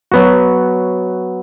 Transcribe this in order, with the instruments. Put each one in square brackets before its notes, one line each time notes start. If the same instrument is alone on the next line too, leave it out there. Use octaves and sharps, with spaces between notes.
[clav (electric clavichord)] F#3 B3 F#4